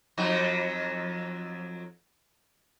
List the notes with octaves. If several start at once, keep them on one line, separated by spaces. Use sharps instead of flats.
F2 F#3 D#4